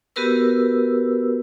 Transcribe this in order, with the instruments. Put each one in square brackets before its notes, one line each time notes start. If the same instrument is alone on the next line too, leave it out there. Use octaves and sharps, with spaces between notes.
[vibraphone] B3 F#4 G4 A#4 B4 E6